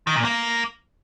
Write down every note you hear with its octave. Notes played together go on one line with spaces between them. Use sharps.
D#3
A#2
A#3